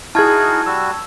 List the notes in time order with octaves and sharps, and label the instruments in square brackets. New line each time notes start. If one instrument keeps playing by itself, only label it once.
[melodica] D#4 F#4 A#4 [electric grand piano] E4 G#4 [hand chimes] A5 G#6
[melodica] G3 F#4 [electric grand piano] E6